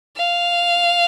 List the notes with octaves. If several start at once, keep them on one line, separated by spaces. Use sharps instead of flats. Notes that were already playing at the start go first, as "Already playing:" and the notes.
F5